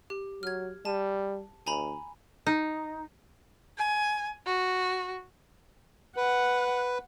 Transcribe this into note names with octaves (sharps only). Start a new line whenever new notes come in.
G4
F#3 F6 G#6
G3 A5 D#7
D2 G#5 A#5 B5
D#4
G#5
F#4
B4 F#5